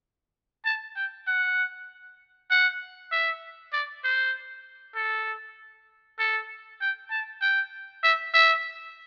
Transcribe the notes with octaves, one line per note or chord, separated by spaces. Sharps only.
A5
G5
F#5
F#5
E5
D5
C5
A4
A4
G5
A5
G5
E5
E5